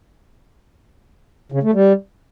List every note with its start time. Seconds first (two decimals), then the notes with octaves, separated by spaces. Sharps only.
1.52 C#3
1.63 A3
1.74 G3